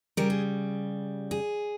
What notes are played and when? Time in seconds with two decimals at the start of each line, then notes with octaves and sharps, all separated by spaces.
0.17 C#3 G3 A#4
0.30 G#4
1.31 G#4